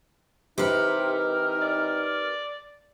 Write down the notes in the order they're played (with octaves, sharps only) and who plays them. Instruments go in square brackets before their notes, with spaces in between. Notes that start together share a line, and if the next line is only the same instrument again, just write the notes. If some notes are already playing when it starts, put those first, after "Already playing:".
[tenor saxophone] C3 [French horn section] E3 C4 D#4 [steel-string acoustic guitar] G4 B4 [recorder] A#4
[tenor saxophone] D5